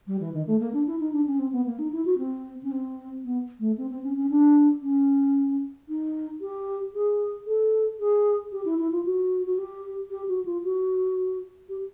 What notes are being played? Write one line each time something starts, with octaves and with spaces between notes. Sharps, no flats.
G3
E3
D#3
A3
A#3
D4
E4
D#4
D4
C#4
C4
B3
A#3
D#4
E4
F#4
C4
C#4
C4
B3
A3
C4
C4
C#4
C#4
D4
C#4
D#4
G4
G#4
A4
G#4
G4
E4
E4
F4
F#4
F#4
G4
G4
F#4
F4
F#4
G4